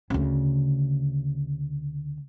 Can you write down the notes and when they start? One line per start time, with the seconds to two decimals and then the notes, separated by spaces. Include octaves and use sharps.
0.10 D2 C#3